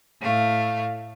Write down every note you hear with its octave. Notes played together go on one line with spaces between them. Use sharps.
A2 A3 F5